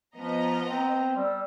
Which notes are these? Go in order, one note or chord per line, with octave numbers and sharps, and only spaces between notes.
F3 B3 D#5 A#5
C4
G3 D5 E6